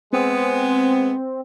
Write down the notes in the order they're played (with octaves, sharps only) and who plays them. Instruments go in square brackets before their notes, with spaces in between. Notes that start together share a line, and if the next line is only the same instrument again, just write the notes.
[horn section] G#3 B3 [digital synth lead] C4